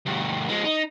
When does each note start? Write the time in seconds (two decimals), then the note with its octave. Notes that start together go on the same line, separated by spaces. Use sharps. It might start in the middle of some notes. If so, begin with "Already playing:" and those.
0.06 D2 G2
0.49 F3 G#3
0.65 D#4